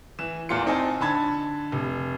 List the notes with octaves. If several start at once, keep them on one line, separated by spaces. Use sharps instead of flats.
E3 E7
E2 A#2 F4 C6 C#7
C4 D#4 C5 G#5 A5
D3 A5 B5 G#6
F1